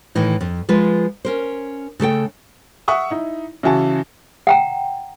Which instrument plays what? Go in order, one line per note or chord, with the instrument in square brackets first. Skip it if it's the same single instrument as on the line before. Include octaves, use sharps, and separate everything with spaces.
[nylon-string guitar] A2 D#3 E3 D#4
F2
F3 G#3 F4 B4
C#4 A#4 C5
C#3 A3 A4 G5
[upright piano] E5 F#5 C#6 D#6
D#4 E4
C#3 E3 E4 F#4 G#5 A5
[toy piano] F#5 G5 A#5